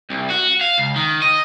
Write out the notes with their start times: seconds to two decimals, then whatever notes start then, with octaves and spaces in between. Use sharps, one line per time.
0.10 C2
0.30 F#4
0.61 F5
0.78 C#2
0.96 D#3
1.22 D#5